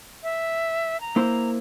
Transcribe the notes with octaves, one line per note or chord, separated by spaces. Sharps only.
E5
A#5
A#3 E4 C5